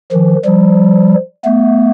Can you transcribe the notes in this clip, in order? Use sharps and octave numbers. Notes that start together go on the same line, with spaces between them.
D#3 F3
F3 G3
A3 B3